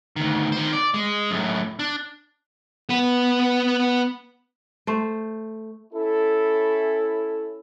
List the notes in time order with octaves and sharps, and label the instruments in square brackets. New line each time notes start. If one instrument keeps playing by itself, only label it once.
[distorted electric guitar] D2 D#3
D#3 C5
D5
G#3
F#2 A2
D4
[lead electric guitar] B3 B4
[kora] A3 C5
[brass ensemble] C#4 E4 A4